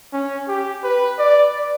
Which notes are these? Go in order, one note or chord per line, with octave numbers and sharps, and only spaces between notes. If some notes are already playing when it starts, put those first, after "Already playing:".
C#4
G4
B4
D5